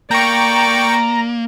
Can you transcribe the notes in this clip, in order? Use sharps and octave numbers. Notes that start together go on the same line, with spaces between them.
A#3 D5 G5 A#5 C#6